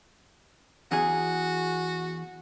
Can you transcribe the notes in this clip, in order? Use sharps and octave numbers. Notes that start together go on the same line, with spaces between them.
E2 F#4 G#4